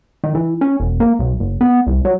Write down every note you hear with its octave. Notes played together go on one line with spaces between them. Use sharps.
D#3
E3
C#4
E1
A#3
B1
F#1
B3
C2
F#3